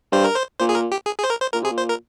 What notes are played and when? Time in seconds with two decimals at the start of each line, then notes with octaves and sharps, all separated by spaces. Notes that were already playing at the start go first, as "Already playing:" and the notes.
0.12 G2 C5
0.24 A#4
0.36 C5
0.60 A#2 C5
0.69 G#4
0.75 A#4
0.92 G4
1.06 G#4
1.19 G#4
1.24 C5
1.30 A#4
1.41 C5
1.53 A#2 A#4
1.62 C3 G#4
1.70 A#2
1.78 C5
1.89 A#4